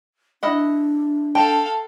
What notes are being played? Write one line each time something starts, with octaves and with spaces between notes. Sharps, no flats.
D4 E4 D#5 F#5
A4 F5 G5 A5